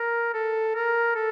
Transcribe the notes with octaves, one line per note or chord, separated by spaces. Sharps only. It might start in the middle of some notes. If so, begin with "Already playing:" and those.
Already playing: A#4
A4
A#4
A4